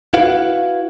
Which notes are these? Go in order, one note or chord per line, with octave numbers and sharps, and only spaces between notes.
E4 F#4 B4 F5 F#5